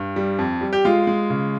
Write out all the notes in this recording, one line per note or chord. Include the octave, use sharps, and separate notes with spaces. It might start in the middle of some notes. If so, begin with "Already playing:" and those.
Already playing: G2
G3
F2
G3
G4
G#3 F4
G#3
C#3